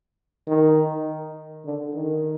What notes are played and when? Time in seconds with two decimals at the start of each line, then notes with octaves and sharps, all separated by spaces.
0.47 D#3
1.65 D3
1.95 D#3